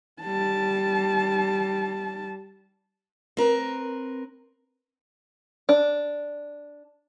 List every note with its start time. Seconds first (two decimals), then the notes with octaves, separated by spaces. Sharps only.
0.22 G3 A5
3.37 C4 A#4 B4
5.69 D4